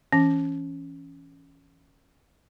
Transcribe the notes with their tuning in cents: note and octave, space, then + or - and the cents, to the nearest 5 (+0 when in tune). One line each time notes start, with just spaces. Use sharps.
E3 +0 C#4 +0